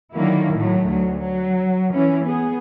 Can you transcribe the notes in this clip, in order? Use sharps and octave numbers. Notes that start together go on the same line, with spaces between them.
D3 D#3 F#3 A#3 E4
A2 F#3 A3
D2 F#3
F#3
E3 C#4 E4
B3 G#4